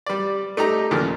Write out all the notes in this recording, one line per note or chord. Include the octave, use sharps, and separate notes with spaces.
G3 D5
A3 D#4 G4 A#5
D#2 A#2 C#3 F3